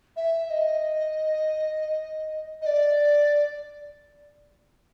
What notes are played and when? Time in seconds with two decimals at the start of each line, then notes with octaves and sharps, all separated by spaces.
0.16 E5
0.47 E5
0.50 D#5
2.62 D#5
2.66 D5